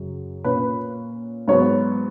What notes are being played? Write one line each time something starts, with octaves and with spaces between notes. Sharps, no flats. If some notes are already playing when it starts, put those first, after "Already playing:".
Already playing: F#2 C#3 F#3
A#2 A#3 C#4 B4
G#2 F#3 B3 C#5